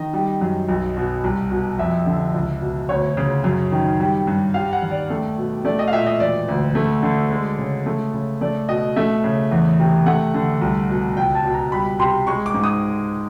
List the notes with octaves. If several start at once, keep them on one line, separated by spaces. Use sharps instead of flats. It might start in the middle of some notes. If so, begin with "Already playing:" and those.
Already playing: D#3 D#5
G3
F#2
B1
B2
C2
B2
F2 E5
D3
C#2
B2
D2 C#5
C#3
F#2
D#3
G3
G2
G3 F5
F#5
D#2
D5
A3
B2
A3 D5
D#5
F5
A#2 E5
D#5
E1 D5
D2
A3
D3
G#3
C#3
A3
C#3
A3 D5
B2 D#5
A3 E5
C#3
E2
C3
A3 F#5
D3
C2
B2
C#2 G5
A5
B2
A#5
G3 B5
C3 C6
G#3 C#6
D6
G#2
D#6